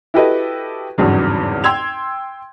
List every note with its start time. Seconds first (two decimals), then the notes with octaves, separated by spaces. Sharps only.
0.14 E4 F#4 G4 A4 B4 D#5
0.98 G#1 E2 G2 C#3 F#3
1.64 G5 C6 E6 G#6 F7